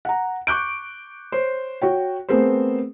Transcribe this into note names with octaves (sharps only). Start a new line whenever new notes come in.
F#5 A#5
C#6 D6 F#6 G6 D7
C5 C#5
F#4 C#5 G5
A3 B3 C4 G#4 A#4 C5